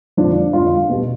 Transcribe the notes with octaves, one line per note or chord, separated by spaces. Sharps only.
F2 D3 F3 D4
F2 D3 F3 F4
B2 G3